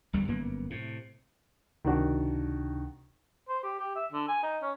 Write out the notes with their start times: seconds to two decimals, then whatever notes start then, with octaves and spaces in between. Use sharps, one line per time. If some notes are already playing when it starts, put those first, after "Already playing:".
0.13 G1 E2 G2 G3
0.28 G1 F#2 A#3 B3
0.70 A2 C3
1.85 C#2 C3 D#3 D4 F#4
3.49 C5
3.63 G4
3.79 G4
3.95 E5
4.12 D3
4.28 G#5
4.43 D#4
4.62 C#4